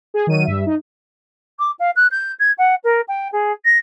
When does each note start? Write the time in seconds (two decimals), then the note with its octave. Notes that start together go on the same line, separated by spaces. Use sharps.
0.14 G#4
0.27 D#3 F#3 D#7
0.45 G2 E5
0.66 D#4
1.59 D6
1.79 F5
1.96 F#6
2.11 G6
2.39 G#6
2.58 F#5
2.84 A#4
3.08 G5
3.32 G#4
3.65 A#6